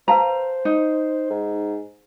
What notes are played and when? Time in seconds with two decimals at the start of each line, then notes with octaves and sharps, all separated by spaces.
0.08 B4 C5 F5 A5 A#5
0.65 D#4
1.30 G#2